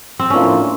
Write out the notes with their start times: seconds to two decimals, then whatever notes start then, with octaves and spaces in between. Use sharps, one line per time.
0.19 C4
0.29 A2 F3 A#3 C#4 D4 F4